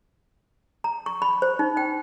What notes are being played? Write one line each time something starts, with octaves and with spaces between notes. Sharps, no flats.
A#5
C#6
B5
C5
D#4
G5